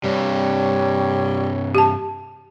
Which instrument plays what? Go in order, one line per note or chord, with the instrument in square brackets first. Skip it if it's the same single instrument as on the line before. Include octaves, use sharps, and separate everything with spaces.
[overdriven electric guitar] G2 C3 [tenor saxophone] G3 [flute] C#5
[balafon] G4 A5